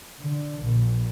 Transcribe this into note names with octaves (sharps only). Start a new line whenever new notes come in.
D3
A#1